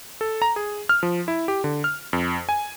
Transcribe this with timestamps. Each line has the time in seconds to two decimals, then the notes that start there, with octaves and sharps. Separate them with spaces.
0.21 A4
0.42 A#5
0.56 G#4
0.89 F6
1.03 F3
1.28 E4
1.48 G4
1.64 D3
1.84 F6
2.13 F2
2.49 G#5